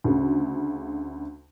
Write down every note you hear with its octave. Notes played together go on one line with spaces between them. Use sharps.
D2 C#3